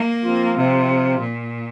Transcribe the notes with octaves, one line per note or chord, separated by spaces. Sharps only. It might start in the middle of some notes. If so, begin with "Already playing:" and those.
Already playing: A#3
F3 C4 F4
C3
A#2